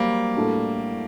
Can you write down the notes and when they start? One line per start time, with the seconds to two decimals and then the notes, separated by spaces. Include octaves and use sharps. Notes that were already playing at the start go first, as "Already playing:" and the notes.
Already playing: F#3 G3 A#3 C4
0.35 A2 A3 D4 F#4